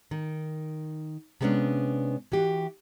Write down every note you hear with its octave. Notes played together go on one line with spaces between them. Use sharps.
D#3
C3 G#3 A#3 B3 C#4 D4
E3 F#4 G4